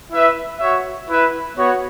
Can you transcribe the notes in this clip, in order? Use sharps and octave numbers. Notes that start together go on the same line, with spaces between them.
E4 B4 E5
F#4 C#5 E5
E4 B4 E5
B3 F#4 C#5